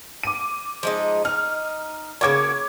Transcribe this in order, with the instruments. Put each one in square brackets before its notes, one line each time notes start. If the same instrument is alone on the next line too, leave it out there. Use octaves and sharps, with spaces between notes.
[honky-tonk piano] D6 D#7
[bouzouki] F3 G#3 D#4
[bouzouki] D#4 [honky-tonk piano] F6
[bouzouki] C#3 A#3 F#4 [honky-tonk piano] C#5 D6 G#6